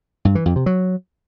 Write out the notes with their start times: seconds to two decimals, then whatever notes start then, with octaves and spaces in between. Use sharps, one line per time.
0.25 G2
0.35 E3
0.46 F2
0.56 C3
0.66 F#3